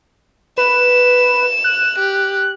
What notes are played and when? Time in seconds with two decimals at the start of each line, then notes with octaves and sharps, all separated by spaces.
0.58 B4 E7
1.64 F#6
1.99 G4